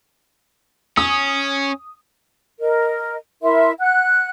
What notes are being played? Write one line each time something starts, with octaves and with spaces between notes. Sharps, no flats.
C#4 D#6
A#4 D#5
E4 A#4 E5 C6
F#5 F#6